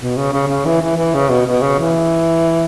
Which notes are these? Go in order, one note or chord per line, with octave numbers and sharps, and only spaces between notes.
B2
C#3
C#3
C#3
E3
E3
E3
C#3
B2
B2
C#3
E3